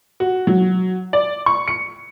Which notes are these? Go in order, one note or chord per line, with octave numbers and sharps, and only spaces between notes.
F#4
F#3
D5
C#6
C#7